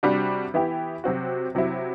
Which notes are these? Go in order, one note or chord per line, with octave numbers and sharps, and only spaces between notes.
C3 G3 D4 F#4
E3 B3 E4 G4
C3 F#3 C4 F#4
C3 F#3 C4 E4